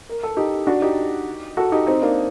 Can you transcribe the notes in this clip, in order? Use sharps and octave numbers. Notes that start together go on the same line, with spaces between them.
A#4
A4
D#4 G4
D4 F#4
D#4 G4
F#4 A4
D#4 G4
C4 D#4
A#3 D4